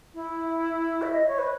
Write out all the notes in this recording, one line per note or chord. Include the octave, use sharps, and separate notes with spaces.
E4
E5
D#5
C#5
B4